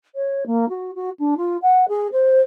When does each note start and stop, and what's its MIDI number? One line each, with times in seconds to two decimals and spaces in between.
0.15 0.44 73
0.46 0.68 58
0.69 0.91 66
0.95 1.10 66
1.19 1.34 62
1.37 1.57 65
1.62 1.84 78
1.88 2.07 68
2.12 2.41 72